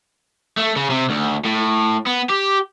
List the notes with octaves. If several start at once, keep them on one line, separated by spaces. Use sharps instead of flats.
A3
C#3
C3
D2
A2
B3
G4